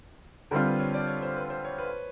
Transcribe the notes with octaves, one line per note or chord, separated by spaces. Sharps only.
D3 G3 C4 F4 A#4
B4
C#5
D5
C#5
C5
B4
C5
C#5
B4